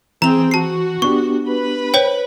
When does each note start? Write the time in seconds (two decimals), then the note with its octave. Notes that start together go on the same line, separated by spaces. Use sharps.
0.22 E3 C4 G#4 A#5 F7
0.51 F#4 A5 C7
1.02 B3 D4 G4 C#6
1.47 B4 B5
1.94 C5 C#5 G5